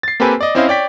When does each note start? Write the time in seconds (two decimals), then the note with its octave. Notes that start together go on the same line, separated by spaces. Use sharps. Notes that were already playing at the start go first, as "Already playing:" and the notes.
0.03 A6 C7
0.20 A#3 C4 G4 A4 B4 G#5
0.41 D5 D#5
0.55 C4 C#4 E4 C5 D#5 F5
0.68 C#5 D5 G5 B6